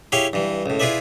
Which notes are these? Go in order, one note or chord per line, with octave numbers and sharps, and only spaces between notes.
E4 G4 G#4 C#5 F5 G5
G2 E3
C#2 A2
E4 F4 G#4 B4 D5 E5